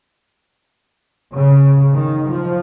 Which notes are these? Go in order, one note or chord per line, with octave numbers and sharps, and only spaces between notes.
C#3
D#3
F3